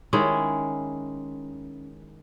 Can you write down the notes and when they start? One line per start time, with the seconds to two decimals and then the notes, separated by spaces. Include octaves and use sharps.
0.13 D#3 G#3 C#4 E4